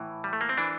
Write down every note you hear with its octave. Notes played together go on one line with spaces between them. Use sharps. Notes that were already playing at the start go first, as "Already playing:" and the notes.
Already playing: A2 E3
G3
A3
A#3
C4
E3 D4